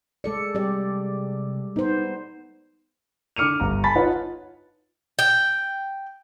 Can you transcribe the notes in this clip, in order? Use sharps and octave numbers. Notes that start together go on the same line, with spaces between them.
G#3 A4 D5 C#7
C3 G3 G4 D5
B3 D#4 C5
D3 D6 F6 C#7 D#7 F7
G1 A#5
G#5 A5 B5 A6 B6
D#4 F4 B4 C#5 D#5 F#5
G5